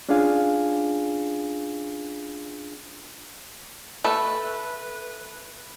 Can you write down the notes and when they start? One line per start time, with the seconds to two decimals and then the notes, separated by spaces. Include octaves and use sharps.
0.09 C#4 D4 F4 G#4 F5 G#5
4.04 A3 A4 B4 B5